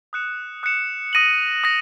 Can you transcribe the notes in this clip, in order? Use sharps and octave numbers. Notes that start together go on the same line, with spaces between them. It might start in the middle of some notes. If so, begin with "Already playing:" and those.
D#6 F#6 C#7 E7
D#6 F#6 C#7 E7
D#6 A#6 D#7 F#7
D#6 A#6